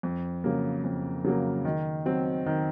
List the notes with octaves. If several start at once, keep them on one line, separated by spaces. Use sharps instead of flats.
F2
C#3 F#3 A#3
F2
C#3 F#3 A#3
D#3
F#3 C4
D#3